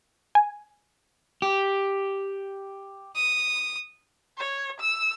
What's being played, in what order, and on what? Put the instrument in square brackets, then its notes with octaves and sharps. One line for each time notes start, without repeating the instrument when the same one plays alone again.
[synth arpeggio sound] G#5
[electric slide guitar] G4
[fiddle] D#6
[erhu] C#5
E6